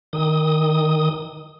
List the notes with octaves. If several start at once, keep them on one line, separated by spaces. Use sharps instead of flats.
D#3 D#6